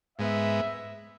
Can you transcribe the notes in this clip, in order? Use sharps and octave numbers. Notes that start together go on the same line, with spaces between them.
G#2 G#3 B3 E5